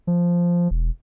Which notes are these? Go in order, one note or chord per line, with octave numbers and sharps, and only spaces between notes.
F3
E1